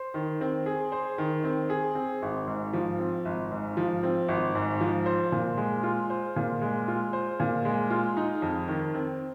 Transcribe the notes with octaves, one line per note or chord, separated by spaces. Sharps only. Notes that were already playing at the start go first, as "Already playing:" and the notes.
Already playing: C5
D#3
C4
G#4
C5
D#3
C4
G#4
C4
G#1
G#2
F3
C4
G#1
G#2
F3
C4
G#1
G#2
F3
C5
A#2
G#3
F4
C5
A#2
G#3
F4
C5
A#2
G#3
F4
D#4
F2
D#3
C4